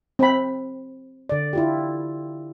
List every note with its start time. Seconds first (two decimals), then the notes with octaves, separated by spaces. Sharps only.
0.19 C4 B5
1.29 D3 D5
1.53 E4 F4 G4